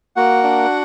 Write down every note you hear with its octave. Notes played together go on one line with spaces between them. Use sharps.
A#3 F#4 F#5
D4